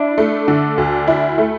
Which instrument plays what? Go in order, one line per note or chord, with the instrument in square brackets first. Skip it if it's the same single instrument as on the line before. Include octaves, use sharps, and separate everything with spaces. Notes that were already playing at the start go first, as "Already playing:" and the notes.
Already playing: [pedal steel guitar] D4 [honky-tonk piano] E4
[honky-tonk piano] A3
D3
D2
E4
A3